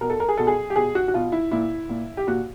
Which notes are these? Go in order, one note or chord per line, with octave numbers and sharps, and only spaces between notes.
B2 A#4
A4
A#4
G#4
B2 A4
G#4
G4
B2 G#4
F#4
F#4
B2 F4
E4
A#2 E4
A#2
G4
A#2 F#4